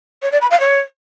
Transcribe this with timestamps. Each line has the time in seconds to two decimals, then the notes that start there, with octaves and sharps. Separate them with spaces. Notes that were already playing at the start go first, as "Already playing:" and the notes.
0.22 C#5
0.32 D5
0.41 B5
0.51 F5
0.60 C#5